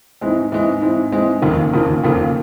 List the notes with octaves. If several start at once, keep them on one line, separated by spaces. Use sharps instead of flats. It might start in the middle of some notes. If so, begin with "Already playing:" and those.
G#2 E3 G#3 C4
G#2 E3 G#3 C4
G#2 E3 G#3 C4
G#2 E3 G#3 C4
F1 D#2 C#3 F3 A#3
F1 D#2 C#3 F3 A#3
F1 D#2 C#3 F3 A#3